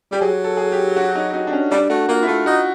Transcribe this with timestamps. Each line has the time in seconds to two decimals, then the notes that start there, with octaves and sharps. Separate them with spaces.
0.11 G3 G4
0.21 F#3 G#4
0.44 A4
0.57 G#4
0.72 G4
0.96 F#4
1.15 D#4
1.33 D#4
1.47 D4
1.53 C#4
1.71 G3 D4
1.90 A3 F#4
2.09 A#3 F4
2.23 E4
2.27 A3 F4
2.46 D#4 F#4